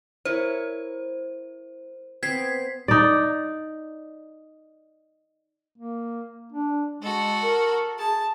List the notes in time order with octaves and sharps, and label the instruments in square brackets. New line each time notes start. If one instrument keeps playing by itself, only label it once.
[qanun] E4 A#4 C#5 [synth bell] C5
[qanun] B3 C4 [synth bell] G#6 B6 C7
[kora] D#4 D5
[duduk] A#3
D4
[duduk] G#3 [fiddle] F#4 A4
[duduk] A#4
[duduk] G#4 [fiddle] A5